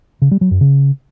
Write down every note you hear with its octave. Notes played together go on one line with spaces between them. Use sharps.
C#3
G3
F#3
F#2
C#3